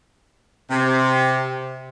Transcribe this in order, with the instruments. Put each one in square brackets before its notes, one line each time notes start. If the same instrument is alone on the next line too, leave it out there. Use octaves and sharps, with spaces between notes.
[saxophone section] C3